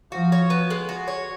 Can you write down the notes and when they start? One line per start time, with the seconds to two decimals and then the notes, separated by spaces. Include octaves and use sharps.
0.12 F3 F#4
0.32 C#5
0.50 B3
0.70 G#3
0.89 F#4
1.08 C#5